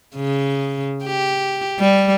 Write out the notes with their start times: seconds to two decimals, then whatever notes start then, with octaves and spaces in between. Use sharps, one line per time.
0.16 C#3
1.04 G4
1.80 G3